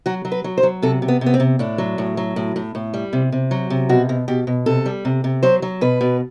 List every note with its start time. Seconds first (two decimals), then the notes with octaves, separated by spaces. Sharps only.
0.06 F#3 F#4
0.25 F#3
0.32 B4
0.44 F#3
0.58 C5
0.63 F#3
0.82 C3 A4
1.02 C3
1.08 B3
1.21 C3
1.26 B3
1.34 C4
1.40 C3
1.59 A2 D4
1.78 F#3
1.98 A2
2.17 F#3
2.36 A2
2.56 A2
2.75 A2
2.94 G3
3.13 C3
3.32 C3
3.51 F#3
3.70 C3
3.89 B2 F#4
4.09 B2
4.28 B2 G4
4.47 B2
4.66 C3 A4
4.86 G3
5.05 C3
5.24 C3
5.43 F#3 C5
5.62 F#3
5.81 B2 B4
6.01 B2